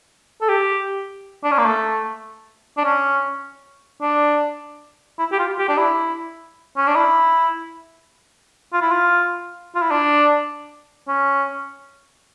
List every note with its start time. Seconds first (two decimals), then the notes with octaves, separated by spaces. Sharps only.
0.41 A4
0.49 G4
1.44 D4
1.52 C#4
1.58 A#3
1.66 A3
2.77 D4
2.84 C#4
4.02 D4
5.19 E4
5.32 G4
5.39 F4
5.59 G4
5.69 D4
5.78 E4
6.77 C#4
6.87 D4
6.96 E4
8.73 F4
8.82 E4
8.92 F4
9.75 F4
9.82 E4
9.91 D4
11.08 C#4